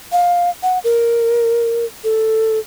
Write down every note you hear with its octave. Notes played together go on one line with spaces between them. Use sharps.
F5
F#5
A#4
A4